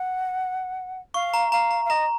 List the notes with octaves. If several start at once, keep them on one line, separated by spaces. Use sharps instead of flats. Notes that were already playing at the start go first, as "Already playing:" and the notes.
Already playing: F#5
F5 C#6
A#5
F5 A#5
A#5
F5
D#5 A#5